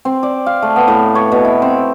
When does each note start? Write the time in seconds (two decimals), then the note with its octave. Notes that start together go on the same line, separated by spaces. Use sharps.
0.05 C4
0.23 D5
0.46 F5
0.62 A3
0.76 B3
0.88 A2
1.15 C#5
1.32 B2
1.45 E4
1.62 C4